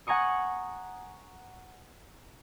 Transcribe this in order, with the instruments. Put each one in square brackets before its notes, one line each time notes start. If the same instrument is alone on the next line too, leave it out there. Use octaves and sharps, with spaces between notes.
[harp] F#5 G#5 A#5 C#6 D#6